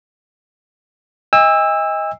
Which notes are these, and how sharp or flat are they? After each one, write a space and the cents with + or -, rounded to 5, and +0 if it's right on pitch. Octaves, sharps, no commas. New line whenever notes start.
D#5 +25 G#5 -45 E6 +0